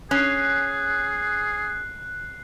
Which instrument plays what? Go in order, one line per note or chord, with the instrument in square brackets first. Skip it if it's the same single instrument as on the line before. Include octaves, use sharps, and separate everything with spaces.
[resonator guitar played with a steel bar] C#4 [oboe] G#4 [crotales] F#6 C7